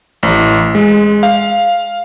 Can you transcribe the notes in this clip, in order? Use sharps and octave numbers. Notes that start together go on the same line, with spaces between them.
A1
G#3
F5